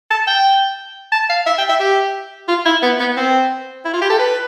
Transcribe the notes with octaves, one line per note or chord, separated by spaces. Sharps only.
A5
G5
A5
F5
E5
G5
E5
G4
F4
E4
B3
B3
C4
E4
F4
G4
A4
B4